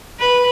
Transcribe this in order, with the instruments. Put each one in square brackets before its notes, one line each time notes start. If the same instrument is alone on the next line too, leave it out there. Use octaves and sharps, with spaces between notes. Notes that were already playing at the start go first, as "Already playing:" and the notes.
[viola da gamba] B4